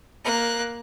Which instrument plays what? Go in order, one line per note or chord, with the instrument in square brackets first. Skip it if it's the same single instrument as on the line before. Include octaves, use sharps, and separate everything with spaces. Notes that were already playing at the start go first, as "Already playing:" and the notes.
[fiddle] A#3 F#6